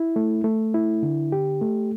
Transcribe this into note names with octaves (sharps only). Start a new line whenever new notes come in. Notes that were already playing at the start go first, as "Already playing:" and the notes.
Already playing: E4
A3
A3
E4
D3
G4
A3